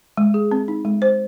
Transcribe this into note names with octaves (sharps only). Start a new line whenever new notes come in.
G#3
G#4
C4
D#4
G#3
C5